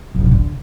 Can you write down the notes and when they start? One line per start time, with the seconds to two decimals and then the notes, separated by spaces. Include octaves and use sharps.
0.15 F2
0.20 D#3
0.26 B2
0.31 D3